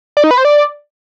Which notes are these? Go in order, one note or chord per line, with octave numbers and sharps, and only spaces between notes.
D5
D#4
B4
C5
D5